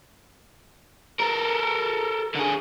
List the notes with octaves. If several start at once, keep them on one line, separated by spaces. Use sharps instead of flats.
A4 A#4
D3 G#4